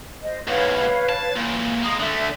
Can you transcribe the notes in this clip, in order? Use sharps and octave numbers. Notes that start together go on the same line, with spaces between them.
C5 D#5
E2 G#2 B4 C#5 F5
A5
A#2 E3
G#3 A#3 D#6
D3 A3 E5